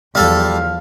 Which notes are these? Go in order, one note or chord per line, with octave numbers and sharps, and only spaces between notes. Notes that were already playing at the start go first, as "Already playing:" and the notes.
E2 F3 G3 A4 F5